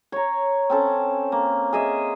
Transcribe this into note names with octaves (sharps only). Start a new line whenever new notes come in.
C#5 A#5
C4 C#4 A4
A#3
G#4 D#5 E5